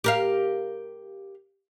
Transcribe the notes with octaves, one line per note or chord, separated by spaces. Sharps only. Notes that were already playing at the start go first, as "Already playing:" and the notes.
G4 A#4 F5